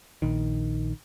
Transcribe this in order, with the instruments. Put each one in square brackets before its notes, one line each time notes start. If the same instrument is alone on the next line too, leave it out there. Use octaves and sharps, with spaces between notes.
[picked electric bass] A#1 D#3